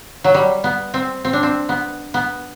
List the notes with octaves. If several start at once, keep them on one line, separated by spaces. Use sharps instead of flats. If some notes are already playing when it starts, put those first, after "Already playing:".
F#3
G3
B3
C4
C4
D4
C4
B3
B3